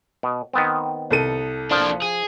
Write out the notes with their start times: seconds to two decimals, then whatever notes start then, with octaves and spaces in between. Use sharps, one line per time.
0.23 B2
0.53 D#3 B3 C4
1.11 C2 A4 D#7
1.71 F3 A#3 D4
2.02 G#4